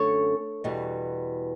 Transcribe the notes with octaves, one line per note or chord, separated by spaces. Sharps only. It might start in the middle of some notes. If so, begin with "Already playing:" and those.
Already playing: F#2 D3 A3 C#4 A4 C#5
E2 B2 G3